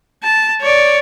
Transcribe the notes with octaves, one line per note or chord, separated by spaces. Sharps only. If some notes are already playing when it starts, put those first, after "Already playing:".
A5
C#5 D5